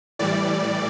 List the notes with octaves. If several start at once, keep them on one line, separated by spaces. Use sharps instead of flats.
A2 E3 G3 D5